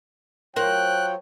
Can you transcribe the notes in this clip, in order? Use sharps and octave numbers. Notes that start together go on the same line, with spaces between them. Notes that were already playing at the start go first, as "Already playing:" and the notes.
F#3 F4 A#4 C5 C#5 G5 F#6